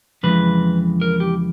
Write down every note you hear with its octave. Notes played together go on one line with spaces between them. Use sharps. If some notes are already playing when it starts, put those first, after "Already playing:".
F2 C#3 E3 G#3 B4
A#4
G4